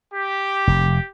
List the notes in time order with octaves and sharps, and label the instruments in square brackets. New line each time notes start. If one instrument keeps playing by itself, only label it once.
[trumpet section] G4
[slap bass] F1